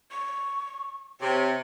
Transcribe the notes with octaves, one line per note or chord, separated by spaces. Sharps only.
C#6
C3 C#5